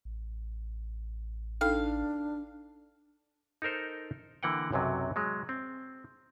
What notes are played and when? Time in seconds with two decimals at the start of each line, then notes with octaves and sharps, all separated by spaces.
0.05 A1
1.61 D4 D#4 A4 F5 G5
3.62 D#4 A4 A#4 C5
4.43 D3 E3 A#3 F#5 G5
4.72 B1 F#2 C3 F#3
5.16 F#3 G#3
5.49 C4